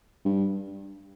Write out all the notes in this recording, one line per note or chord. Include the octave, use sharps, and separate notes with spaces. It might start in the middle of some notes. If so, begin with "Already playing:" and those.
G2